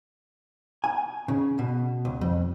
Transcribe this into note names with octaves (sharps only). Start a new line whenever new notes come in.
G#5
C#3
B2
C#2
F2